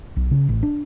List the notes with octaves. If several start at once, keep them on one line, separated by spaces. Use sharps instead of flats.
B1
C#3
A1
D4